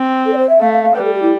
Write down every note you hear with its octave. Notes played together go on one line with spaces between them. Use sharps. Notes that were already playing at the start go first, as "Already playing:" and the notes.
Already playing: C4
A4
D5
C5
E5
A3 F5
F5
F5
G3 B4
A4
G4
E4